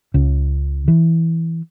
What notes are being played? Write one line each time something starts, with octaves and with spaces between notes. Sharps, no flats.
C#2 C#3
E3